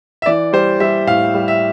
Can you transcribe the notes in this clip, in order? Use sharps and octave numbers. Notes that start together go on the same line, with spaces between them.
E5
E3 D5
G3 C5
G3 E5
A2 F5
G3
E5